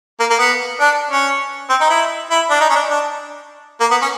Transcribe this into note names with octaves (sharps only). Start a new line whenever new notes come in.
A#3
A#3
B3
D4
C#4
C4
D#4
E4
E4
D4
D#4
C#4
D4
D4
A#3
B3
C#4